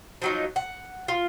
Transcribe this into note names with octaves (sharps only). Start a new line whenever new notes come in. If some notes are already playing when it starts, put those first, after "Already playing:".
F3 F#3 D#4
F#5
F4